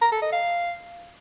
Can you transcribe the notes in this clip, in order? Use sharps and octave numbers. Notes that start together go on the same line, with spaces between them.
A#5
A4
D#5
F5